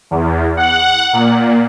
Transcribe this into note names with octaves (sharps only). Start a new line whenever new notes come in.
E2
F#5
A#2